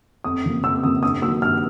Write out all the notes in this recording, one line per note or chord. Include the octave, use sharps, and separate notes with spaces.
F2 D#6
C#3 F3 A#3
F2 E6
C#3 F3 A#3 D#6
G2 D#6
D#3 F#3 A#3 E6
G2 F6